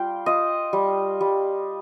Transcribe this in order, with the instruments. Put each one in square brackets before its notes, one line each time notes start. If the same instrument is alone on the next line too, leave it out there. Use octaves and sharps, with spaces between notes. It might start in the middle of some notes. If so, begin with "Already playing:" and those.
Already playing: [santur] G3 F4 G5
F4 D#5
G3
G3